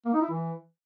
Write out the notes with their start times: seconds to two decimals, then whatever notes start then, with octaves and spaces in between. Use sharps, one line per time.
0.06 A#3
0.14 D#4
0.22 E4
0.30 E3